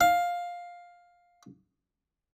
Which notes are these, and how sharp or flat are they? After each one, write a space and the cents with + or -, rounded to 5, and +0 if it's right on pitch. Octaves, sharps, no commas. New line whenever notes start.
F5 +10